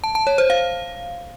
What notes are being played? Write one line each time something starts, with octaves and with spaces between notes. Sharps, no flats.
A5
A5
C#5
C5
F5